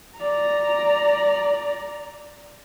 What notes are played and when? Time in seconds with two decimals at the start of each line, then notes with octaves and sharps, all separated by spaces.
0.18 D5 A#5